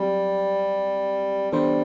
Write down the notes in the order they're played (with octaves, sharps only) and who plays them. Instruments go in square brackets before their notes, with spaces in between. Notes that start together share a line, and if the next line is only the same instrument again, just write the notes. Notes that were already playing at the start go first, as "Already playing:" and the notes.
Already playing: [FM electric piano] F#3 C4 G4 [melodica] G3
[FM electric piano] E3 B3 D4 A4 C5 [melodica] G3